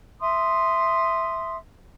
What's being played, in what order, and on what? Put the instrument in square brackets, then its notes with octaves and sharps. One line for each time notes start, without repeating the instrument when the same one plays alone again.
[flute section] E5 C6 D#6